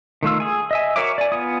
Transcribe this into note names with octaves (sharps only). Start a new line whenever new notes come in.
D#3 A3 F4 E6
G#4 G#5
D#5 E5 G#5
F#4 A#4 C#5 E5 D6
D5 G#5
B3 F4 G#5 D#6